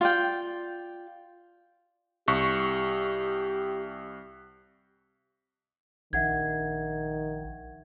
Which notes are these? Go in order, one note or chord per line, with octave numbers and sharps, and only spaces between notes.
F4 D5 G5
C2 G4 C#6
A#1 D#3 E5 F#5 G#6